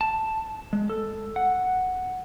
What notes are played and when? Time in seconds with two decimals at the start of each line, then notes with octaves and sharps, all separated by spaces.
0.01 A5
0.73 G#3
0.90 A4
1.36 F#5